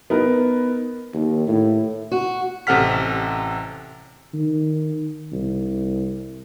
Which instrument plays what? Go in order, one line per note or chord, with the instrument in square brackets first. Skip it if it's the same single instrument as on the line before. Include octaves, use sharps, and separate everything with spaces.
[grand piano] B3 D#4 A#4
[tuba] D#2
A2
[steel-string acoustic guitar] F#4
[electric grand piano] A1 C3 A4 F#5 F6 B6
[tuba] D#3
C2